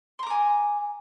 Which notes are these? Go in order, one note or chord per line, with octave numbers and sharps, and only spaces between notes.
G#5 A#5 C6 D6